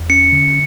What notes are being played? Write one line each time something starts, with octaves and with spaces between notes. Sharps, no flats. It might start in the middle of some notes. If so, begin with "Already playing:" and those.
Already playing: E2
C#4 C#7
D3